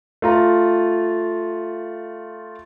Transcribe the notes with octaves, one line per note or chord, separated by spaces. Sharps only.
A3 F4 A#5